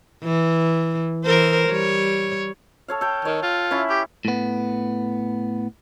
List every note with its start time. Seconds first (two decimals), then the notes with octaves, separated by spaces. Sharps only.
0.23 E3
1.25 E3 A#4 C5
1.69 G3 C#5
2.88 A4 C#5 F5
3.01 A4 G5
3.25 D#3 C#5
3.43 F4
3.71 C#4 E4
3.90 G4
4.25 A2 B3